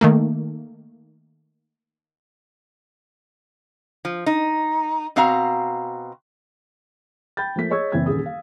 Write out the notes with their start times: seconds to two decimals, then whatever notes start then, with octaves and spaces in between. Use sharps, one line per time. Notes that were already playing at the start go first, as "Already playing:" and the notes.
0.01 D#3 A3 A#3
4.05 F3
4.26 D#4
5.16 B2 C4 F#4 F5 A#5
7.37 G5 B5 G6 A6
7.56 F3 A3 A#3 B6
7.70 G#4 C#5 D#5 C#6 E6 G#6
7.92 F#1 E3 B3 C4 G#6
8.06 D#1 C#3 G#4 D#6
8.26 F5